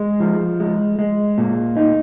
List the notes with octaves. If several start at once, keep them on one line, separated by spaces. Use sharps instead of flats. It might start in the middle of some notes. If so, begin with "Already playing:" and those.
Already playing: G#3
F3
G#3
G#3
A#2
D#4